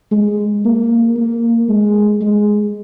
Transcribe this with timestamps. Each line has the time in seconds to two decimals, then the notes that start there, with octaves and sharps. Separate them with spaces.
0.12 G#3
0.65 A#3
1.17 A#3
1.69 G#3
2.21 G#3